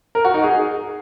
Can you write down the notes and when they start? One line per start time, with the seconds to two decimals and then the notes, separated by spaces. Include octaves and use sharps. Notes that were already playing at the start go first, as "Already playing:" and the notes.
0.15 A#4
0.25 F#4
0.34 D#4
0.44 G#4